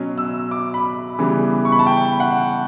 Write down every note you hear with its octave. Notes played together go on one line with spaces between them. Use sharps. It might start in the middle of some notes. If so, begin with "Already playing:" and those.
Already playing: B2 F#3 C#4
E6
D6
B5
C#3 E3 G3 B3
C#6
B5
A5
G5
F#5